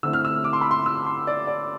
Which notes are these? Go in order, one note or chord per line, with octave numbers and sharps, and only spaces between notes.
D3 A3 C4 E4 E6
F6
E6
D6
C6
B5
C6
E6
C6
D5
D5